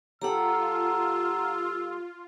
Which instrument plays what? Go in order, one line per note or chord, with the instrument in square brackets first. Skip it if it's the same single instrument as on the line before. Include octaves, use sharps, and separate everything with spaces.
[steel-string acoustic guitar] G3 G4 A4 [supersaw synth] F4 [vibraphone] F#5 A#5 [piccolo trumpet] E6